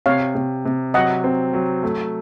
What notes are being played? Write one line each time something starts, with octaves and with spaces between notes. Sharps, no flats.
C3 C#5 F5
C3
C3
F#3 D#5 F#5
C4
F#3
A3